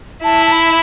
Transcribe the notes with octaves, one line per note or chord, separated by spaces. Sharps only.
E4 A5
A5
B5